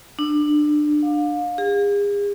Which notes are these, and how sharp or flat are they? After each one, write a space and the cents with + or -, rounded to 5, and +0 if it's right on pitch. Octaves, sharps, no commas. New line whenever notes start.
D4 +25
F5 +30
G#4 -40